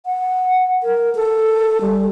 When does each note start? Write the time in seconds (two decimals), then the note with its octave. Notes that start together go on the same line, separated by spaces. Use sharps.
0.06 F#5
0.83 A#4
1.15 A4
1.81 G3